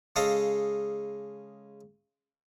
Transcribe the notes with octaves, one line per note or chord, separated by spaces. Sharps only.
C#3 G#3 A4 D#5 F5